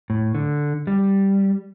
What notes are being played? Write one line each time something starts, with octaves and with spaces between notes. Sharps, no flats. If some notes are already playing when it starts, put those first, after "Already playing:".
A2
D3
G3